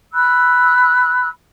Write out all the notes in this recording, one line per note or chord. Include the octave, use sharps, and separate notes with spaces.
B5 E6 F#6